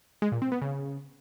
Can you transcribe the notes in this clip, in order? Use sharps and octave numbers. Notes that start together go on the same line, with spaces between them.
G#3
A#2
C4
B3
C#3